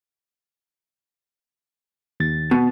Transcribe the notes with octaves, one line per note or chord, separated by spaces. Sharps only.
D#2 A6
B2